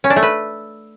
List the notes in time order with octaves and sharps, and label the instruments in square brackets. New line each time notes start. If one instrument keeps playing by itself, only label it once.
[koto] C#4
D4
A3
B4